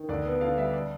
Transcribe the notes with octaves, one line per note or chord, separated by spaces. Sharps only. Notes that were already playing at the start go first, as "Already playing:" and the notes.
Already playing: D#3
D2 D5
B3
D3 F5
G3 E5
D5